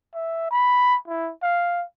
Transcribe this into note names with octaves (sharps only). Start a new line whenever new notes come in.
E5
B5
E4
F5